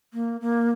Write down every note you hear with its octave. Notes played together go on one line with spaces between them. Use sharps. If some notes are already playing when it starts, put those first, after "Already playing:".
A#3
A#3